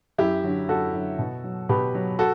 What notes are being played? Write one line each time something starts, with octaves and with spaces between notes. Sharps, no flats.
F#2 E4 G4
D3 F#3
F#2 F#4 A4
D3 F#3
B2
F#3
B2 G4 B4
F#3
F#4 A4